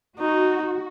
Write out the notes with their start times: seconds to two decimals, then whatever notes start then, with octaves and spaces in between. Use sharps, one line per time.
0.19 D#4 F#4